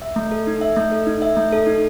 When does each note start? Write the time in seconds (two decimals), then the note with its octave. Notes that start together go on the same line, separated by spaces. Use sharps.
0.02 E5
0.16 A3
0.32 A4
0.47 D#4
0.61 E5
0.76 A3
0.91 A4
1.07 D#4
1.22 E5
1.37 A3
1.52 A4
1.67 D#4